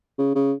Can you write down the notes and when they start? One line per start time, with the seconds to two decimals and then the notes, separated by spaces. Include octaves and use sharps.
0.18 C#3
0.35 C#3